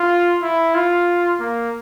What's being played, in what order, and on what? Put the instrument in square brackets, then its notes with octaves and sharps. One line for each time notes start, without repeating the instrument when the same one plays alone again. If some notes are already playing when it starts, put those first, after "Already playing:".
Already playing: [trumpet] F4
E4
F4
A#3